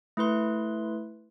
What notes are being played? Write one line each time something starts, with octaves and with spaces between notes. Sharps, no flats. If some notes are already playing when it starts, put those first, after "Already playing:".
A3 E4 B4 C6